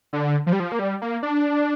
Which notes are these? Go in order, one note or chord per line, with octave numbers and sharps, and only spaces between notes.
D3
F3
G3
F3
A#3
G3
A#3
D4